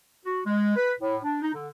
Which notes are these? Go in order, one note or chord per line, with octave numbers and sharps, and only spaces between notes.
F#4
G#3
B4
A2
D4
D#4
D3